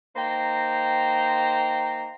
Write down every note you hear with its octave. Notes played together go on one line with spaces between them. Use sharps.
A#3 D#4 C5 G5 A#5